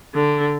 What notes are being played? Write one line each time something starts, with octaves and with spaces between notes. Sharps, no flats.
D3